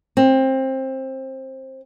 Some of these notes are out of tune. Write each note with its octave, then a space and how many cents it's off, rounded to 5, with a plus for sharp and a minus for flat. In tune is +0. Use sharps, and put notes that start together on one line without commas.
C4 +20